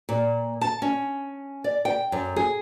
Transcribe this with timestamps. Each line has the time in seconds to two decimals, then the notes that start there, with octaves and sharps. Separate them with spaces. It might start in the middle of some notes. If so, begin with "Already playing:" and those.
0.09 A#2
0.61 A5
0.82 C#4
1.64 D5
1.85 G5
2.12 F#2
2.36 G#4